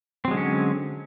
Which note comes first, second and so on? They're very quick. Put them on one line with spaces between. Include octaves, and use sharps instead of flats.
C4 F#3 G#3 D3 C#4